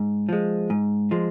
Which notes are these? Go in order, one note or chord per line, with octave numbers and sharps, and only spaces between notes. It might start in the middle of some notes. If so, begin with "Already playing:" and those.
Already playing: G#2
F3 G#3
G#2
F3 G#3